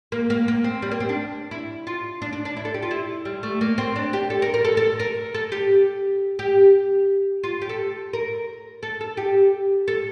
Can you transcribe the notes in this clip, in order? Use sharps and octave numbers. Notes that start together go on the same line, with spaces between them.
A#3
A#3
A#3
C4
G3
A#3
C4
D4
E4
F4
D4
D4
D4
E4
A4
G4
F4
E4
G3
A3
A#3
C4
D4
G4
A4
A#4
A#4
A4
A4
A#4
A4
G4
G4
F4
G4
A4
A#4
A4
A4
G4
A4